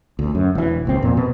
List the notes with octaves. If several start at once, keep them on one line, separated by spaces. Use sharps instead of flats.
D2
F#2
E1 E3
D#1 C#2 C4
F2 A#2
B2